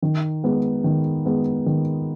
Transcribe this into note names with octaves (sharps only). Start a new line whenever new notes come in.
D#3
G#3 B3
D#3
G#3 B3
D#3